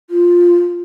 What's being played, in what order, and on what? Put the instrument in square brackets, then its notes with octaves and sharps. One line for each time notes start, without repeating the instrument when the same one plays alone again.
[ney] F4